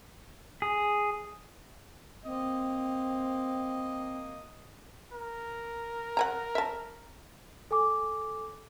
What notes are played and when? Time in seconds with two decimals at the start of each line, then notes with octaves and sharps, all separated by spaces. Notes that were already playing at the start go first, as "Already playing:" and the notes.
0.62 G#4
2.25 A#3 C4 D#5
5.13 A#4
6.17 F#5 G#5 A#5
6.55 E5 A5
7.71 A4 G#5 D6